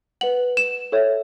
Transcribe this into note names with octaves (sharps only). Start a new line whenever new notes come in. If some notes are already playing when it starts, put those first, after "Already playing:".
B4 F#5 F#7
E7
A4 C#5 E5